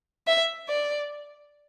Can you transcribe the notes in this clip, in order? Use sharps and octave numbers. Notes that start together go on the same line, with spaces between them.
E5
D5